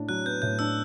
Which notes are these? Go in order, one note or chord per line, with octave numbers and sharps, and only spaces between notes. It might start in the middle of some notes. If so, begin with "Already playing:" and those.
Already playing: A2 D4
F#3 F#6
B3 G6
A2 G6
D4 E6